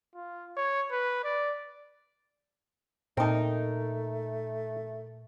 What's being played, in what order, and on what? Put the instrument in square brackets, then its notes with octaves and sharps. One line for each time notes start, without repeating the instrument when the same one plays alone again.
[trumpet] F4
C#5
B4
D5
[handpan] A#2 [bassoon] A3 [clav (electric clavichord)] C4 A4 [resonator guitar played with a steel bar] D#4 A#4